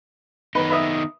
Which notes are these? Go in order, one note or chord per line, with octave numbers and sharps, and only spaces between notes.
D#3 B3 D#4 B4
B4 E5 D#6